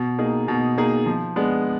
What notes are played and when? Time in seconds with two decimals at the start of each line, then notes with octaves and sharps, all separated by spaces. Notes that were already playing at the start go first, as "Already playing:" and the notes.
Already playing: B2
0.18 A#3 D#4 G#4
0.48 B2
0.78 A#3 D#4 G#4
1.06 F3
1.36 G#3 B3 D4